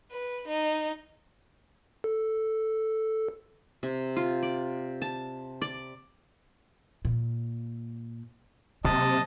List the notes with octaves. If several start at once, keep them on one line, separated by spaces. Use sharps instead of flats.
B4
D#4
A4
C3
F4
D5
A5
D5
A#2
C3 F#3 A#3 D#5 A5